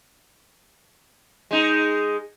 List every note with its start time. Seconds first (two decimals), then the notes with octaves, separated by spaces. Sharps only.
1.51 G#3 D#4